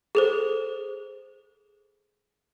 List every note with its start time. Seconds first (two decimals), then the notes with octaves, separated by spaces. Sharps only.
0.15 G#4 A4 C5